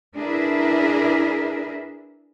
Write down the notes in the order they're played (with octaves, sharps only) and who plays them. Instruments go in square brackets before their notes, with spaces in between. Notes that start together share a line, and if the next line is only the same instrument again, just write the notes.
[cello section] D4 E4 G#4 A#4 B4 E5